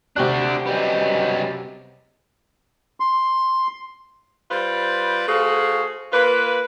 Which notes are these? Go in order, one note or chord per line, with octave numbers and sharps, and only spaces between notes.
C3 D4 F#4 G4 F#6
C#3 F#3 G3 B3 D#5
C6
G3 F4 B4 C5
A3 F#4 G#4 C5 F5
A#3 F4 B4